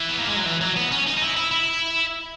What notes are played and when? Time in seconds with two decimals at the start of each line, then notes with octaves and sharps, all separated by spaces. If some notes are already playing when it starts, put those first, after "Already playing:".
Already playing: E3
0.09 B3
0.18 A#3
0.27 G#3
0.36 F#3
0.46 E3
0.61 F#3
0.76 B3
0.91 C#4
1.07 D#4
1.17 D#4
1.22 E4
1.37 E4
1.51 E4